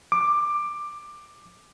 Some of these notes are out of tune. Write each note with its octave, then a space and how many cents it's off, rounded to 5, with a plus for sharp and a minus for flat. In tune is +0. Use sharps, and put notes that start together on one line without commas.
D6 +15